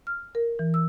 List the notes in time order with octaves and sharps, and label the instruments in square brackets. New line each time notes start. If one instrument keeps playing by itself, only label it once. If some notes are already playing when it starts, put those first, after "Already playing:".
[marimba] F6
A#4
E3
E6